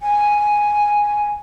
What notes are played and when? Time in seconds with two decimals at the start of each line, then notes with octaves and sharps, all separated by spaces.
0.02 G#5